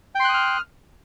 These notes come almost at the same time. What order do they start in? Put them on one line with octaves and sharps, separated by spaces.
G5 C6 F#6 D#6 F6